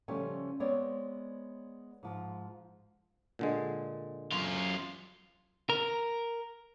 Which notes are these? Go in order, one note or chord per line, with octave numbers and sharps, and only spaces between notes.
C#3 F3 G3 A3 C#4 G#5
G#3 B3 C4 C#5 D5
G#2 F3
A#2 D3 G#3
F#2 F4
A#4